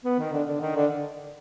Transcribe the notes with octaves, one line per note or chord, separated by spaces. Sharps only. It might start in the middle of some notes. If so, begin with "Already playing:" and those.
B3
D#3
D3
D3
D#3
D3